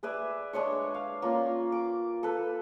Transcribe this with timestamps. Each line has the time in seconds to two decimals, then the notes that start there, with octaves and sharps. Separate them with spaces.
0.03 G#4 B4 D5 E5
0.53 G#3 D4 C#5 C#6
0.95 F5
1.22 A#3 C#4 F4
1.72 D6
2.23 A4 B4